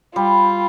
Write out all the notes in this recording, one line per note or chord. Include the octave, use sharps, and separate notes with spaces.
G3 F4